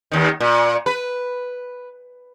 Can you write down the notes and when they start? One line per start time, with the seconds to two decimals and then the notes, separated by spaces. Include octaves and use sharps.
0.12 D#2 D#3
0.40 A#2
0.86 B4